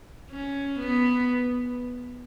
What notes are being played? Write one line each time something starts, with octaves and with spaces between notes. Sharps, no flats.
C#4
B3